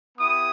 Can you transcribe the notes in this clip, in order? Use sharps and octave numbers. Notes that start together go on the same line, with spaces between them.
B3 E4 G4 D#6